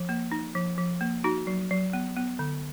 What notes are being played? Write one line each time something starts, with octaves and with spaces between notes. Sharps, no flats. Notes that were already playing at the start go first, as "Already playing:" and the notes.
Already playing: F3
A#3
D#4
F3
F3
A#3
D#4 F#4
F#3
F#3
B3
B3
D3